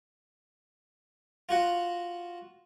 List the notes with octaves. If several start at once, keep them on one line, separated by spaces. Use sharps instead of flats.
F4 F#4 F#5